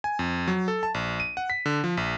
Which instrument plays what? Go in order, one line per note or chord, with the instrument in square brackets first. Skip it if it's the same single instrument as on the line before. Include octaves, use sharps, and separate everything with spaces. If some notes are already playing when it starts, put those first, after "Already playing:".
[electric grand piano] G#5
F2
F#3
A4
A5
A#1
D#7
F#5
B6
D3
F3
A#1